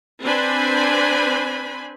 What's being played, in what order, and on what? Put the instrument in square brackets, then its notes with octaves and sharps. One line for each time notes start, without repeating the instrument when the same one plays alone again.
[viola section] C4 D4 B4 C5 G#5 B5